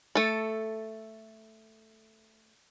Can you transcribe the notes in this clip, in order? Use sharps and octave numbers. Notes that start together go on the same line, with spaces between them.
A3 A4